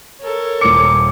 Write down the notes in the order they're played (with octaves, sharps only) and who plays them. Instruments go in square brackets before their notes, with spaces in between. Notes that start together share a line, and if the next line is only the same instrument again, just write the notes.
[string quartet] A4 A#4 C#5
[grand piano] D#1 C#7 [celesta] D6